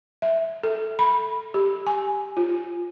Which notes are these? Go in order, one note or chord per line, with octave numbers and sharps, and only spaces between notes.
E5
A4
B5
G4
G#5
F4